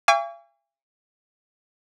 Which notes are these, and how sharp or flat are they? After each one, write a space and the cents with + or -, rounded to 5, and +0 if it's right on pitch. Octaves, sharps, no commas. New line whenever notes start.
F5 -45 G#5 -40 C#6 +45